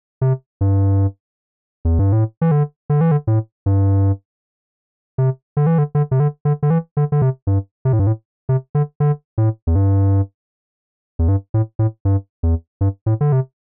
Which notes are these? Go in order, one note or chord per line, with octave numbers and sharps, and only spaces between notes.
C3
G2
E2
G2
A2
E3
D3
D3
E3
D3
A2
G2
C3
D3
E3
D3
D3
C3
D3
D3
D3
E3
D3
D3
C3
G2
C3
A2
G2
A2
C3
D3
D3
A2
E2
G2
E2
G2
A2
A2
G2
E2
G2
A2
D3
C3